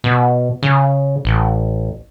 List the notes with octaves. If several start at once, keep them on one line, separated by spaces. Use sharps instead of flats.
B2
C#3
A1